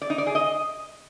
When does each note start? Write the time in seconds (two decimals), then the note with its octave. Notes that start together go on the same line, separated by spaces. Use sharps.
0.02 D5
0.10 D#4
0.18 D5
0.27 G#4
0.35 D#5